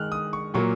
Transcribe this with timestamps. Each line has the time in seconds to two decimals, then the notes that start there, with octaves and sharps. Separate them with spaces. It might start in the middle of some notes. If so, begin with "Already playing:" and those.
Already playing: D#3 G#3 F6 F#6
0.12 D#6
0.33 C#6
0.54 A#2 F#3 A#3 C#6